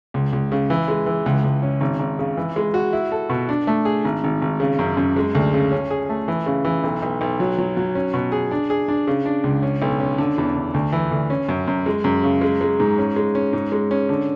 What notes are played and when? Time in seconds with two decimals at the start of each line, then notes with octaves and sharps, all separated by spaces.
0.14 C#2
0.33 C#2
0.52 C#3
0.70 E3
0.88 G#3
1.06 E3
1.26 C#2
1.44 C#2
1.62 C#4
1.81 G#1
1.99 G#1
2.19 C#3
2.37 E3
2.56 G#3
2.74 F#4
2.93 E4
3.12 A4
3.30 B2
3.49 D4
3.67 A3
3.85 G#4
4.05 G#1
4.24 G#1
4.42 G#1
4.60 C#3
4.79 F#2
4.97 F#2
5.17 G#3
5.35 D2
5.54 C#3
5.71 C#4
5.91 G#4
6.09 A3
6.28 E3
6.46 C#3
6.65 E3
6.84 B1
7.02 B1
7.21 B1
7.40 F#3
7.58 F#3
7.77 F#3
7.95 C#4
8.14 B2
8.32 G#4
8.51 D4
8.70 G#4
8.88 D4
9.07 C#3
9.26 D4
9.44 C#2
9.62 C#4
9.82 B1
10.00 C#4
10.18 D3
10.38 E2
10.56 D3
10.74 D2
10.92 E3
11.12 D2
11.30 C#4
11.49 F#2
11.68 F#2
11.86 G#3
12.04 F#2
12.23 C#3
12.41 G#3
12.61 G#3
12.80 G#2
12.98 C#4
13.16 G#3
13.35 C#4
13.53 G#2
13.72 G#3
13.91 C#4
14.09 D3